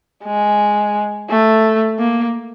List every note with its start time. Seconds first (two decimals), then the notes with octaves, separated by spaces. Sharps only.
0.24 G#3
1.29 A3
1.99 A#3